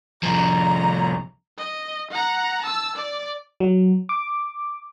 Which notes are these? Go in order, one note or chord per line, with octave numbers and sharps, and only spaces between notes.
C2 F3 A#5
D#5
F#5 A#5
A5 E6
D5
F#3
D6